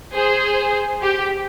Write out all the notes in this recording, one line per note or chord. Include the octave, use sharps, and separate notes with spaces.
G#4 C5
G4